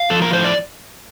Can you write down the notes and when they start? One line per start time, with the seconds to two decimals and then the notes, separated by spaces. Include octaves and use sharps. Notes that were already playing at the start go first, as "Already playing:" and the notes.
Already playing: F5
0.10 F3 A4
0.22 A#4
0.33 A2 C5
0.44 D5